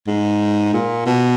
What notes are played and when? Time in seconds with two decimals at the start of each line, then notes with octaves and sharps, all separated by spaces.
0.07 G#2
0.74 A#2
1.06 B2